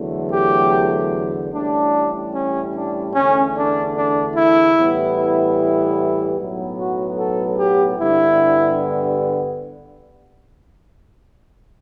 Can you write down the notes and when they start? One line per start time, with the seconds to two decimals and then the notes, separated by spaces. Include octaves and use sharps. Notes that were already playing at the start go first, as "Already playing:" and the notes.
Already playing: E2 D3 F#3 A3
0.30 G4
1.52 A1 A2 G3 D4
2.33 C#4
2.73 D4
3.13 E2 D3 A3 C#4
3.54 D4
3.95 D4
4.35 E4
4.75 A2 E3 G3 B3
5.16 E4
6.37 B1 A2 F#3 B3
6.78 F#4
7.18 A4
7.59 G4
7.99 G2 D3 G3 B3 E4